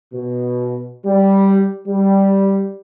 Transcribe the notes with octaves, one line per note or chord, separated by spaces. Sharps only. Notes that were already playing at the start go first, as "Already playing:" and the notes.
B2
G3
G3